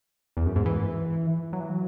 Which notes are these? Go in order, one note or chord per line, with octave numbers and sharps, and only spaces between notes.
E2
F#2
G#2
E3
F#3
E3
F#3